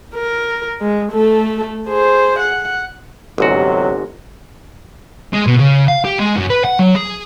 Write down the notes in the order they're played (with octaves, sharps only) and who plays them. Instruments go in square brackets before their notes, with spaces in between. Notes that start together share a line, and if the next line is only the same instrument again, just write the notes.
[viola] A#4
G#3
A3 A4
G#4 C5
F#5
[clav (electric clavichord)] G1 G#2 F#4 [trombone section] C3 F#3 D#4
[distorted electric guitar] G#3
B2
C#3
F5
G4
G#3
F#2
B4
F#5
F#3
G#4